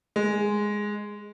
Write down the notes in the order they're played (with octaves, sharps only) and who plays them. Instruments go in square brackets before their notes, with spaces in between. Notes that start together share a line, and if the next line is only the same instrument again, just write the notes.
[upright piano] G#3